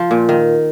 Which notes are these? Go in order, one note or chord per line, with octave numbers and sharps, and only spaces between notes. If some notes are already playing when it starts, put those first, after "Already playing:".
Already playing: F3
A#2
D#3